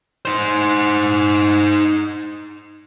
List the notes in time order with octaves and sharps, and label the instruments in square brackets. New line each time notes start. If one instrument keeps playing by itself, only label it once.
[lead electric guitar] D#4 C5